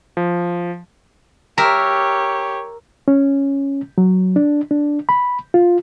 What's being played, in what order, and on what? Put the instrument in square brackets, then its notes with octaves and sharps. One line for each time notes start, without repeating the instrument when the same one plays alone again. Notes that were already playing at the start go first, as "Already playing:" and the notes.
[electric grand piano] F3
[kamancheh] G4 C#5 [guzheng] A#4 E5
[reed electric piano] C#4
F#3
D4
D4
B5
F4